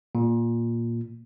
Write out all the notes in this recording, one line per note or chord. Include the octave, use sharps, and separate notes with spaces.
A#2